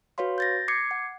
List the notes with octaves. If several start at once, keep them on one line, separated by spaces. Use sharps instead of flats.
F#4 B4 C#5 F5 C6
G6 A6 A#6
D6 G#6 C7 C#7
F#5